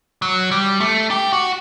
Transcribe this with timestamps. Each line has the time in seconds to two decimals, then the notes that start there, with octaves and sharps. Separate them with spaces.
0.22 F#3
0.51 G3
0.80 A3
1.11 G4
1.33 F#4